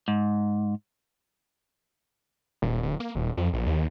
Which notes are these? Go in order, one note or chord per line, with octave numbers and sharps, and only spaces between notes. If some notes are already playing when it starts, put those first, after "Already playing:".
G#2
D#1
D1
A#3
D#1
F2
A#1
D#2